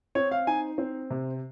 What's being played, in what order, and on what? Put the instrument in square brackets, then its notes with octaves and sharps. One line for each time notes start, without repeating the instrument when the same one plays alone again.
[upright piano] C4 [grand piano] C#5
[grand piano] F5
[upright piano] D#4 [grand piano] G#5
[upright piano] C4
C3